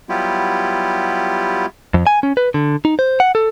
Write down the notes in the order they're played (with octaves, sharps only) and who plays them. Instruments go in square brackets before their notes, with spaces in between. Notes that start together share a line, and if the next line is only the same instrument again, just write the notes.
[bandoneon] F#3 G3 B3 E4 F4 G4
[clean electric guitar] F2
G#5
C#4
B4
D3
D#4
C5
F#5
A4